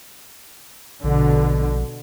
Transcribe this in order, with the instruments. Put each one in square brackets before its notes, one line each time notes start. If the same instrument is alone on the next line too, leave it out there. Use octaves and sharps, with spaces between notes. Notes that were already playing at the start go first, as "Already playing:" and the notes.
[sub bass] A#1 [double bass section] B2 D3